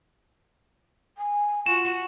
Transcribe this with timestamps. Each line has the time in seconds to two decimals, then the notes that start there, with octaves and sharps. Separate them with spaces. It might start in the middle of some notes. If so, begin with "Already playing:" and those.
1.17 G#5
1.66 F4 F#4 E7